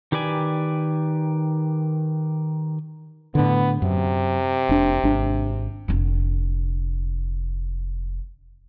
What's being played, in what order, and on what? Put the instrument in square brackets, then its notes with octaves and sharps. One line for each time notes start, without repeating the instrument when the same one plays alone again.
[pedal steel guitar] D#3 G4 B4 D5 G#5
[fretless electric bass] A2 D3 [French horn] B3
[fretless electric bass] F#2 [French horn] C3
[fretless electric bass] F1 D4
G#1 D4
[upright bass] F1 D3